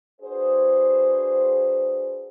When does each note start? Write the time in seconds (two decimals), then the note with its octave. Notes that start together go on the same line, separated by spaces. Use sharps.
0.21 D4 F#4 G#4 B4 C5